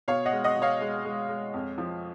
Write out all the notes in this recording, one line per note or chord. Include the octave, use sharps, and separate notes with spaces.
B2 C#5 F5
D#5 F#5
G#3
D#5 F#5
B2
C#5 F5
G#3
G#3
G#3
F2
F3